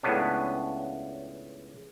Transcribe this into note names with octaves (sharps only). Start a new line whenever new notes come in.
C#2 A2 B3 C#4 D4